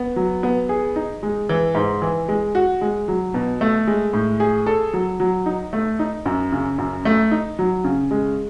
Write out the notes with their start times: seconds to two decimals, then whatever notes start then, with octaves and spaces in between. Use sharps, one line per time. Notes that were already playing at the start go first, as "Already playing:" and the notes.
Already playing: B3
0.16 F#3
0.43 B3
0.69 G#4
0.96 D#4
1.23 G#3
1.49 E3
1.75 G#2
2.02 E3
2.28 G#3
2.55 F#4
2.81 G#3
3.08 F#3
3.34 B2
3.61 A3
3.87 G#3
4.13 A2
4.40 G#4
4.66 A4
4.93 F#3
5.20 F#3
5.46 D#4
5.73 A3
5.99 D#4
6.26 F#2
6.52 C#3
6.78 F#2
7.05 A3
7.31 D#4
7.59 F#3
7.84 C#3
8.11 G#3